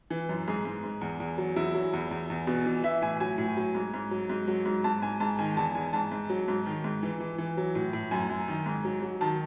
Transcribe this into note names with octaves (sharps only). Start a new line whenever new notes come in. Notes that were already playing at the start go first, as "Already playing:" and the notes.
E3
F#2
G#2 G#4
G#2
G#2
E2
E2
F#3
E2 E4
F#3
E2
E2
E2
B2
E3
E3 E5
A2 G#5
F#3 G#5
A2
F#3
G#2
G#2
F#3
G#2
F#3
G#2
G#2 A5
G#2 G#5
G#2 A5
D#3 G#5
E2 A5
E2 G#5
G#2 A5
G#2
F#3
G#2
D#3
G#2
E3
E3
E3
F#3
A2
A2
F#2 G#5
F#2
D#3
G#2
F#3
F#3
D#3 A5